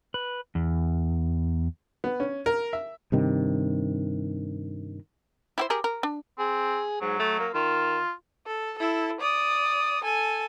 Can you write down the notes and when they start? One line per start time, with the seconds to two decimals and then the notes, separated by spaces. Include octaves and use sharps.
0.14 B4
0.55 E2
2.04 B3
2.20 C#4
2.46 A#4
2.73 E5
3.12 G2 C3 D#3
5.58 E4 G4 C5
5.70 G4 G#4 A#4
5.84 A#4
6.03 D4
6.39 C4 G#4
7.01 G#2 F#3
7.19 A3
7.39 A#3
7.54 D#3 F4
8.47 A4
8.78 E4 A4
9.21 D5 D#6
10.04 A4 G#5